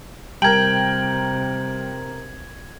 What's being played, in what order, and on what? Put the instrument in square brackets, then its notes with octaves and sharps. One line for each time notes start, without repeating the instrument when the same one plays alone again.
[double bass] C3 [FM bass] G3 [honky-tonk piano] A#4 G5 [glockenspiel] G#6 F#7